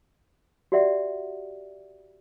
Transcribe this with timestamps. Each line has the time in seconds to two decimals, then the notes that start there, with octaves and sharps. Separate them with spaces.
0.72 F#4 G4 D5 E5 F#5